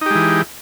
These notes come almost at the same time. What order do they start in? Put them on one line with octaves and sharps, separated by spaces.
D#4 G4 G#3 E3